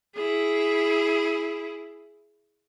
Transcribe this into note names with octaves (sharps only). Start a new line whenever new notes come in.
E4 G#4